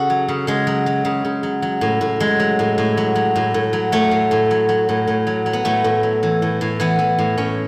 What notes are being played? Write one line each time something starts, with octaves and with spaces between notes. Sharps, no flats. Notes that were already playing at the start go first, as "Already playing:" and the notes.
Already playing: C#3 F#4 A4
F#3
C#3
C#3 G#3
F#3
F#3
C#3
C#3
F#3
F#3
A2
A2
F#3 G#3
F#3
A2
A2
F#3
F#3
A2
A2
F#3
F#3 A3
A2
A2
F#3
F#3
A2
A2
F#3
F#3
B3
A2 A3
A2
F#3
E3
A2
A2
E3 B3
E3
A2
A2 C#4